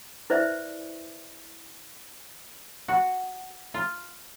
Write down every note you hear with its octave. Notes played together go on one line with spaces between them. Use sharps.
E4 B4 C5 D5 E5
F#4
F4